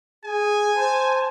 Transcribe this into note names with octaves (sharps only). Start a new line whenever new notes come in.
G#4 G#5
C5 A5